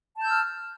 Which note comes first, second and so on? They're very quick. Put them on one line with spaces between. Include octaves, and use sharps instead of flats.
A5 G6 E6 F6